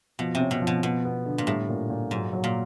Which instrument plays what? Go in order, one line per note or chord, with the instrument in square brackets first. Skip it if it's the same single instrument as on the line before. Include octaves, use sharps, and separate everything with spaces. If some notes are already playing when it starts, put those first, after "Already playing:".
[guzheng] B2 [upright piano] F3
[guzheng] C3
[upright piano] C#4
[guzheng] B2
[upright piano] F3
[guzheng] B2
[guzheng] B2 [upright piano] B3
[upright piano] B3
D3
[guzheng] A#2
[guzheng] A2 [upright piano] G3
[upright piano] A#2
A#2
[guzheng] G#2 [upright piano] F#3
[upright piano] F#3
[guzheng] A#2